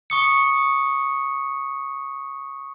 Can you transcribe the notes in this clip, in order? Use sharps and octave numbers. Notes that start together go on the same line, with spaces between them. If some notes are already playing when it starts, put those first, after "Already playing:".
C#6 D#6 C#7